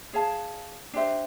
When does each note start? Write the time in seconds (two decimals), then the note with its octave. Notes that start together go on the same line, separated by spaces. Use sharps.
0.13 G#4 C#5 F5 A5
0.94 D4 G4 C5 E5